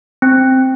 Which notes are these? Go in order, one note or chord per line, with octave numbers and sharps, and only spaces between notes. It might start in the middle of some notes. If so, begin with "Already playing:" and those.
C4